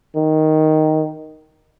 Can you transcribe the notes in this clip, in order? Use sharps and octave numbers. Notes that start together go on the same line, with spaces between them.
D#3